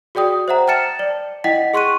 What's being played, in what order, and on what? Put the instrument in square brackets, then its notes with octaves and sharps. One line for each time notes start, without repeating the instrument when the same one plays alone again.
[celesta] F#4 G#4 D5 G5 D#6
C5 E5 F#5 A#5
G5 A5 F6 A6 C#7 E7
D5
E4 D#5 F#5 G5 B6
G#4 C6 C#6 F#6 D#7